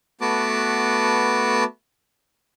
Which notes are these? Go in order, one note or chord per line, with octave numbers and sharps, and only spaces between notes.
A3 B3 F#4 B4 A5 D6